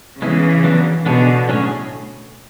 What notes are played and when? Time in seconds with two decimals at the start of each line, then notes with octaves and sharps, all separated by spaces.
0.21 C#3 E3 G#3 B3 E4 G#4
0.64 F#3 B3 D4
1.06 B2 D3 B3 D4 G#4 C#5
1.48 A2 F#3 C#4 G#4 C#5